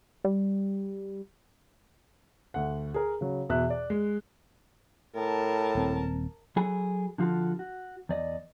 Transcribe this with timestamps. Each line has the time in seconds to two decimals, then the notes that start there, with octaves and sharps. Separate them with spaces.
0.24 G3
2.54 D2 F#5
2.94 G#4 A#4
3.21 C#3 F#3
3.49 E2 B2 E5 F#6
3.70 D5
3.90 G#3
5.16 A2 A#4 A5
5.75 D#1 C4
6.56 F#3 F#4 G#4 A4 B5
7.18 D3 F3 F4 F#4 A4
7.59 F#4
8.09 E2 D5 D#5